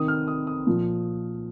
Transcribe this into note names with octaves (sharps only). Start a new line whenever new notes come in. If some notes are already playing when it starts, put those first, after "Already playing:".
Already playing: C3 D#3 D#6
F6
D#6
D#6
A#2 F3